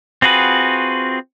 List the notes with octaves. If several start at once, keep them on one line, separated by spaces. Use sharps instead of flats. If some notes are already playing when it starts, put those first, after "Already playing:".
C4 F4 F#4 G#4 B4